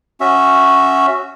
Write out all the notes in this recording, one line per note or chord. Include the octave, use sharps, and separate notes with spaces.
C#4 F#4 E5